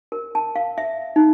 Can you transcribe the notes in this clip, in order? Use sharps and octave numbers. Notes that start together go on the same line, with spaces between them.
A#4
A5
F5
E5
D#4